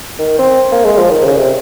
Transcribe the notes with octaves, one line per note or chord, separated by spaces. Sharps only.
D#3
C4
A#3
G#3
F3
D#3
C#3
C3